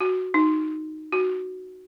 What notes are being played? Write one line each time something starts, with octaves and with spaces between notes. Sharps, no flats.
F#4
D#4
F#4